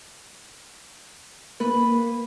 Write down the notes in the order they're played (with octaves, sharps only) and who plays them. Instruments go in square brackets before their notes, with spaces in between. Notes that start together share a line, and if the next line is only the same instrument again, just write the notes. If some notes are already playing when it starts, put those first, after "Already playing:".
[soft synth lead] A#3 [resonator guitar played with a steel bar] B4